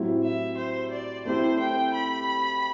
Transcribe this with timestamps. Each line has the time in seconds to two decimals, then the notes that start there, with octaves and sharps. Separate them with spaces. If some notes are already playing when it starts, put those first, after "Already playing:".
Already playing: A2 F#3 C4 E4 G4
0.23 E5
0.57 C5
0.91 D5
1.25 A3 C4 E4 G4 C5
1.60 G5
1.94 B5